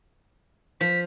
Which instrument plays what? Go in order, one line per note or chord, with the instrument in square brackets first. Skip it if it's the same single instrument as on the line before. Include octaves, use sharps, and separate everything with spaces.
[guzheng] F3 [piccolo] B6